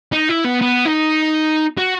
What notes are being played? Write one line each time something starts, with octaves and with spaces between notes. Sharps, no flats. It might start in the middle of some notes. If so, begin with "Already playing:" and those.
D#4
E4
B3
B3
D#4
F#4